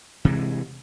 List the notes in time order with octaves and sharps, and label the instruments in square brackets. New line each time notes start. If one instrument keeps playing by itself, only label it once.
[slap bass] C3 E3 G#3